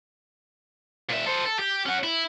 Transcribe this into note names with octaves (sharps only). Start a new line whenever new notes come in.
A#2 E5
A4 C5
A4
G4
C#4 F#5
E4